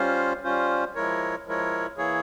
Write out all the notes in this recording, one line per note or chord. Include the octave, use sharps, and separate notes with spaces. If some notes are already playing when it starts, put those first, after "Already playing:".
Already playing: G3 C#4 F4 C5
G3 C#4 F4 C5
F3 G#3 E4 A#4 C#5
F3 G#3 E4 A#4 C#5
E3 A#3 E4 G#4 C#5